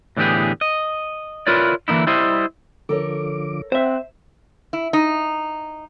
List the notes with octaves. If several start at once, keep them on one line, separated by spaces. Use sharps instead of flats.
A2 D3 E3 B3 G4 G#4
D#5
E4 F4 A#4 B4 C#5 D5
D3 E3 A#3 D#4 E4
G3 E4 C5 D#5
D3 F3 A4 A#4 C#5 D6
C4 C5 E5 F#5
E4
D#4